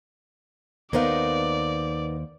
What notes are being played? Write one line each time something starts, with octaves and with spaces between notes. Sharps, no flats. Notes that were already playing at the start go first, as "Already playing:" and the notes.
D#2 B3 D#4 A#4 C5 D5 F5